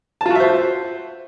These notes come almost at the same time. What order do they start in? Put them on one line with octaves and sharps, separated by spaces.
A5 F4 F#4 E5 C5